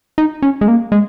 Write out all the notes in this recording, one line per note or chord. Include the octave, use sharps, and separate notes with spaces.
D#4
C#4
G#3
A#3
G#3